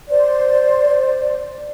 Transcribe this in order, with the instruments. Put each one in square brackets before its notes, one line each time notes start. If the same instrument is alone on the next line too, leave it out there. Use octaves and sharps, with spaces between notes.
[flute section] C5 D5